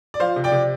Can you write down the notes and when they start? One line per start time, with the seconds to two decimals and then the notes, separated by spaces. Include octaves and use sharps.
0.14 D5
0.20 F3 C5 F5
0.36 C3
0.44 D5 G5
0.52 C3